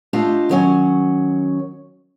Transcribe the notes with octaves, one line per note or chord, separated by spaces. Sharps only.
A3 D4 F4 G4 D#5
D#3 F#3 C#4